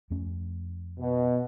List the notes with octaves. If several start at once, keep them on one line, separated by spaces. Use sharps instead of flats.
F2 A3 C#4
B2